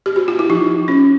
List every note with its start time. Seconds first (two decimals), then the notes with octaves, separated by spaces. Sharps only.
0.06 G4
0.16 F#4
0.28 F4
0.39 E4
0.50 F3 D#4
0.88 C#4